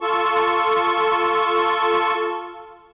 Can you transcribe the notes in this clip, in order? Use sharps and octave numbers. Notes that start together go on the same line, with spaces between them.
F4 A4 A5 C#6